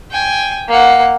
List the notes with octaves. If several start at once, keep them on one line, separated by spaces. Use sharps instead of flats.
G5 G#5
A#3 F#5